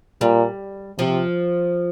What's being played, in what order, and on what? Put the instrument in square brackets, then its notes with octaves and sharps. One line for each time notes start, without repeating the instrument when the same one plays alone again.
[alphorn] A#2 [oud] G3
[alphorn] C3 [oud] F3